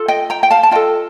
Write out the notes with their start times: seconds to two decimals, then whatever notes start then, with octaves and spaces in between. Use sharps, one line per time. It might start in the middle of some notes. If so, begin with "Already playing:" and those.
Already playing: F4 A4
0.08 D#5 G5
0.30 G5 A#5
0.43 G5
0.51 F5 A5
0.63 A5
0.71 F4 A4 D#5 G5